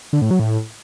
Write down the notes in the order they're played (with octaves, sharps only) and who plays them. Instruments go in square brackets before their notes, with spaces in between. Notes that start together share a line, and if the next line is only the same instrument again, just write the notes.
[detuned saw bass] D3
A2
F#3
A2